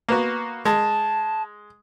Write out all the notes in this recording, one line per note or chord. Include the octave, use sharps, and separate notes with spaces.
A#3 B3 F#4
G#3 A5